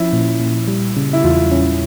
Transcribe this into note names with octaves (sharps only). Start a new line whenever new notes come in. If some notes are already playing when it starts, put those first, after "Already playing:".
Already playing: F3 C#4 E4
A#2
A#2
G3
C#3
E4
E2 F4
C#4